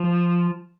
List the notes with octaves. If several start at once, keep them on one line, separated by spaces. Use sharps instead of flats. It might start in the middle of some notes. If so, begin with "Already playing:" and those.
Already playing: F3